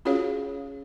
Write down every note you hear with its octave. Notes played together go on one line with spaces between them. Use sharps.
C#4 F4 F#4 G#4 C#5 F5